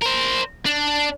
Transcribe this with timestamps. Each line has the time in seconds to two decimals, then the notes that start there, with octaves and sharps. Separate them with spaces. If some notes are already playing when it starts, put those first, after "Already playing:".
0.02 A#4 C5
0.66 D4